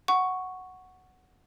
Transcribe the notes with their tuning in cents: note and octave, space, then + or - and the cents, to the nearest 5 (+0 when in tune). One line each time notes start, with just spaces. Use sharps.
F#5 +0 C#6 +0